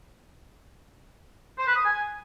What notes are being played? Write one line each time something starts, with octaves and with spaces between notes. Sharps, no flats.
C5
B4
D#6
G#5